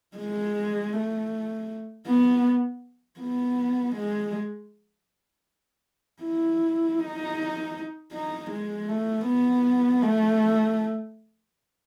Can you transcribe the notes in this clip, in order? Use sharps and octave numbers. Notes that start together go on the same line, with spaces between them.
G#3
A3
B3
B3
G#3
E4
D#4
D#4
G#3
A3
B3
A3